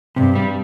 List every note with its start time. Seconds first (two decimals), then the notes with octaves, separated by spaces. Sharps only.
0.16 G2 C3
0.35 G3